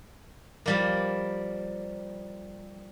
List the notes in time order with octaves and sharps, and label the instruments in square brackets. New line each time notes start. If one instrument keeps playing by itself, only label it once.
[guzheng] F3 G3 A#3